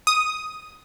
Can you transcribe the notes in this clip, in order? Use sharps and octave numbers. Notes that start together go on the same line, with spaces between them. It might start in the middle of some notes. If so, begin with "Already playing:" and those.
D#6